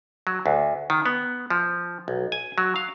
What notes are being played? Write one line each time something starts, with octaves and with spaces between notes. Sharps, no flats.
F#3
D2
D#3
B3
F3
B1
G#5
F#3
F5